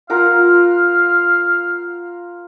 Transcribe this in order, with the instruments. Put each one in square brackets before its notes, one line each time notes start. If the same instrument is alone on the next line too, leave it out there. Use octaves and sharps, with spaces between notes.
[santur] F4 A#4 F#5 [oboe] F5